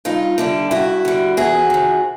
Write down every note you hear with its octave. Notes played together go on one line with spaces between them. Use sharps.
G2 D#4 F4
D3 G3 D4 E4
G2 E4 F#4
D3 G3
E2 F#4 G#4
C3 D#3